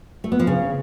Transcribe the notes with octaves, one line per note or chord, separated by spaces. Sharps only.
A3
B3
F3
C#3